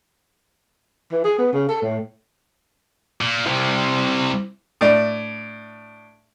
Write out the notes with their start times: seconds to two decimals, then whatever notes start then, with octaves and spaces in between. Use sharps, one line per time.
1.12 E3
1.24 G#4
1.38 B3
1.53 C#3
1.69 A4
1.82 A2
3.21 A#2
3.46 C2 C3 E4 C5
4.81 A2 D4